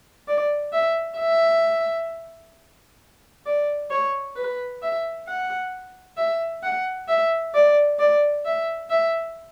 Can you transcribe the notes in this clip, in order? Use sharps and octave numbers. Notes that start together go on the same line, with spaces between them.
D5
E5
E5
D5
C#5
B4
E5
F#5
E5
F#5
E5
D5
D5
E5
E5